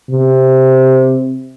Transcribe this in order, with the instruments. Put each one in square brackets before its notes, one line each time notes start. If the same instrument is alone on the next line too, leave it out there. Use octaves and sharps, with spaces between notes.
[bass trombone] C3